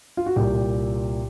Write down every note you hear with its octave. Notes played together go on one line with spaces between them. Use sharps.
F4
F#4
C2 A#2 G4